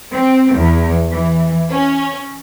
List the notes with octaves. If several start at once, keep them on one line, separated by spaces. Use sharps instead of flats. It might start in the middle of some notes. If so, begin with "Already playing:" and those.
C4
E2
E3
C#4